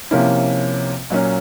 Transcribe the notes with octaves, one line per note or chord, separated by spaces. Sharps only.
C3 F3 A#3 C#4 E4
A#2 F#3 A#3 C#4